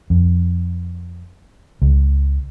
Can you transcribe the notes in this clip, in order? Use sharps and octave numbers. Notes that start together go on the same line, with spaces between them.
F2
C#2